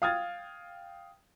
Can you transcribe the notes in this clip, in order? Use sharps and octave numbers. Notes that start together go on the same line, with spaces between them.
F5 G5 D#6 F6 G#6 A6